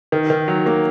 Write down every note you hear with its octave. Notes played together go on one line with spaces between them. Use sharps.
D#3
D#3
F#3
A#3